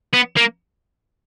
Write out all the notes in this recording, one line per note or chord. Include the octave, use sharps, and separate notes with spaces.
B3
A#3